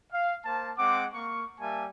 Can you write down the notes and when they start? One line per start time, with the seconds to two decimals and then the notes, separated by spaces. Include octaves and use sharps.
0.12 F5
0.46 A#3 C5 A5
0.78 G#3 C4 F#5 D6
1.14 A#3 C#6
1.60 G3 A#3 E5 G#5 A5